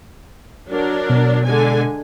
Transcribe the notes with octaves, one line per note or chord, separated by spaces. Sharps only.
F#3 D4 A#4
B2
D3 G#3 G#5